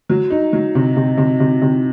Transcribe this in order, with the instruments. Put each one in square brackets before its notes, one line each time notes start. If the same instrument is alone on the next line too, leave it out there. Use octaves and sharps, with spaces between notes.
[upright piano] F#3
D#4
F#3
C3
C3
C3
C3
C3